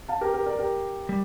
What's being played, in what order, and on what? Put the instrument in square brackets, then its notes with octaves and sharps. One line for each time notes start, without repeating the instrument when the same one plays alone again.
[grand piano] F5 A5
G4 A#4
G4 A#4
A#4 D5
G4 A#4
[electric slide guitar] G3